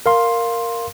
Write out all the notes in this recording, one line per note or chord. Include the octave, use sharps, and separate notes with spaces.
A#4 F5 C6